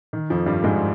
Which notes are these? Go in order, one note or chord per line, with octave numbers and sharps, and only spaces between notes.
D#3
F2 F3
G2 G3
G#2 G#3